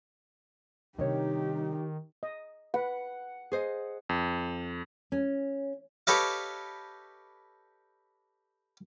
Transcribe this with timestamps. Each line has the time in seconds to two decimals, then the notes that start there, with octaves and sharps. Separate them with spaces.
0.98 C3 D#3 G3 D4 D#4 G4 C#5
2.23 D#5
2.74 B4 F#5
3.52 G#4 C5 D#5
4.09 F2
5.12 C#4
6.07 G4 A4 B4 C#5 D#5 F5